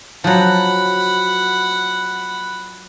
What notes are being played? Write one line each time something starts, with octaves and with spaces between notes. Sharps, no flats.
F3 F#3 F#5 B5